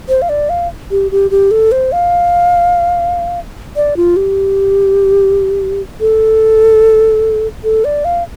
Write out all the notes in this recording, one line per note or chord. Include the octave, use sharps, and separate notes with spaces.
C5
F5
D5
F5
G4
G4
G4
A4
C5
F5
D5
F4
G4
A4
A4
D5
F5